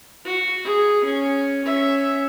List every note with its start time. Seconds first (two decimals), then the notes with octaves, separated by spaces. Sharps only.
0.25 F#4
0.64 G#4
1.04 C#4
1.64 C#4 E5